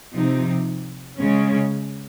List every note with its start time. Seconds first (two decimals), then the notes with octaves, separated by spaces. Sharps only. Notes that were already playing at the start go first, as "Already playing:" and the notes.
0.12 C3 F3 C4 D#4
1.18 C#3 G#3 C#4